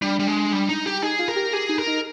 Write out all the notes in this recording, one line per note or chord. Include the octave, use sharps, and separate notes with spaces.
G3 D4
G3
G#3
G3
D#4
G4
D#4 G#4
F4
A#4
G4
G4 G#4
D#4
A#4
D#4